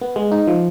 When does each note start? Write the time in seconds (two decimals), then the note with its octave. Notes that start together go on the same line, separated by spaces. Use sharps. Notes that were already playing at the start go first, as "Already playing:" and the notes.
0.01 B3
0.16 G#3
0.32 D#4
0.47 F3